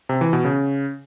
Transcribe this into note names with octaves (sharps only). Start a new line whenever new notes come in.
C3
E3
B2
C#3